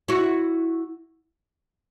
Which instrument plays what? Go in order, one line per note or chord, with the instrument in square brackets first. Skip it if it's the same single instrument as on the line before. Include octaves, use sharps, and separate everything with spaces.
[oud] E4 F#4